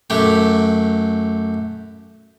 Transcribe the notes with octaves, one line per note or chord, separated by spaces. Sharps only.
F#2 A3 G4